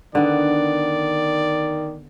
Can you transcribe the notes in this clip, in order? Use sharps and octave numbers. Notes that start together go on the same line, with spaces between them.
D3 D#3 B3 D5